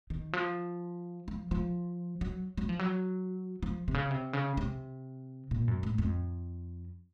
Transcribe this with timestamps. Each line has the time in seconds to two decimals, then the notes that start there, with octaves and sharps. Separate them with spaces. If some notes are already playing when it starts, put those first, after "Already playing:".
0.10 D#3
0.33 F3
1.28 F3
1.51 F3
2.21 F#3
2.57 F#3
2.69 F3
2.79 F#3
3.63 F3
3.88 C3
3.94 C#3
4.11 C3
4.33 C#3
4.57 C3
5.51 A#2
5.68 F#2
5.83 A2
5.98 F2